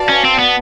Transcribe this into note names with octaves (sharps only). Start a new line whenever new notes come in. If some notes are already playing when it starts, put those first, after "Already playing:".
Already playing: F#4 B4 D5 F5 A5
C#4
C4
B3